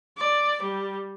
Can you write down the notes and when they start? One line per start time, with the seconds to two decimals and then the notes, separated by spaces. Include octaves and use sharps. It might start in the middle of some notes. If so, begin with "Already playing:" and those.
0.17 D5
0.63 G3